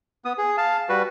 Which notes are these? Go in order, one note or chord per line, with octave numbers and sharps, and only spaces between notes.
B3 D#6
G#4
F5 A5
G3 F#4 B4